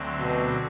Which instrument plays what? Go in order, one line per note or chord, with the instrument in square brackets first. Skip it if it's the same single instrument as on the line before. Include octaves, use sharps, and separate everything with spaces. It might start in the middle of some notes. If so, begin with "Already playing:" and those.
Already playing: [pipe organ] D2 D3 F#3 A3 C4
[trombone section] B2